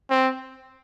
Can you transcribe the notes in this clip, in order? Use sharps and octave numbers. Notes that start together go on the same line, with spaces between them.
C4